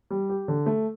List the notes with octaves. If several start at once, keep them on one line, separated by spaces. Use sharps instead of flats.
G3
G4
D3
A3